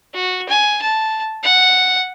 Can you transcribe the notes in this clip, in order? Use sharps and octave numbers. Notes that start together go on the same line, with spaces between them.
F#4
G#5
A5
F#5